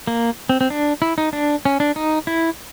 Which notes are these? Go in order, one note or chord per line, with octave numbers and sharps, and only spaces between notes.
A#3
C4
C4
D4
E4
D#4
D4
C#4
D4
D#4
E4